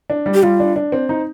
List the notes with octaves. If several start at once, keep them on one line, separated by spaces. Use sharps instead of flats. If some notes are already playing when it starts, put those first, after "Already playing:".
D4
G3
G4
G3 F4
D4
D4
C4
D#4